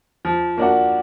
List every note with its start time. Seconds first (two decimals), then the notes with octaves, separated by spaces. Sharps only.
0.25 F3
0.58 A#3 D4 F#4